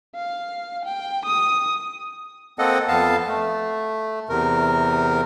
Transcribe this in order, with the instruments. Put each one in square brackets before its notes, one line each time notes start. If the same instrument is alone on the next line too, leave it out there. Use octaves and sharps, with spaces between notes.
[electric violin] F5
G5
D#6
[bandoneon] A#3 C4 A4 D#5 F#5
F2 B3 F5 A5
A3
E2 C3 A#4